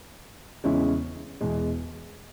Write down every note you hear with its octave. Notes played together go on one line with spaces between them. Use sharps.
E2 C#3 G#3 C#4 E4
E2 B2 G#3